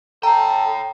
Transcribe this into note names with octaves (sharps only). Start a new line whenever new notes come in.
A4 C#5 G5 A#5